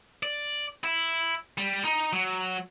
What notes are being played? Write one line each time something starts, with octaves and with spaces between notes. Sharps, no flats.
D5
E4
G3
D#4
F#3